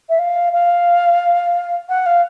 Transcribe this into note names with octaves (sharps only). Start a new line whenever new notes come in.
E5
F5
F5
F#5
F5